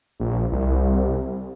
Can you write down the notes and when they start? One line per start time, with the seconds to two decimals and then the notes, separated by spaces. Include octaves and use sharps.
0.20 A#1
0.52 C2